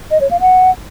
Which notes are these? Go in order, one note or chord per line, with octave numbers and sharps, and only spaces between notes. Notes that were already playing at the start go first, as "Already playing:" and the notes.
D#5
C#5
F5
F#5